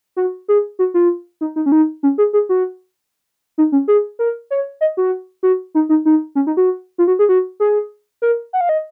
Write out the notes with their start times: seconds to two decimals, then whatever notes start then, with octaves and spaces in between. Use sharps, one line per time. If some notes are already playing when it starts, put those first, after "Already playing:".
0.16 F#4
0.48 G#4
0.79 F#4
0.94 F4
1.41 D#4
1.56 D#4
1.66 C#4
1.72 D#4
2.03 C#4
2.18 G#4
2.33 G#4
2.49 F#4
3.58 D#4
3.72 C#4
3.88 G#4
4.19 A#4
4.51 C#5
4.81 D#5
4.97 F#4
5.43 F#4
5.75 D#4
5.89 D#4
6.05 D#4
6.35 C#4
6.47 D#4
6.57 F#4
6.98 F4
7.07 F#4
7.19 G#4
7.29 F#4
7.60 G#4
8.22 A#4
8.53 F#5
8.61 F5
8.69 D#5